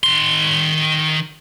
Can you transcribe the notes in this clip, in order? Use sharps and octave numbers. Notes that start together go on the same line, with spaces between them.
D#3 C6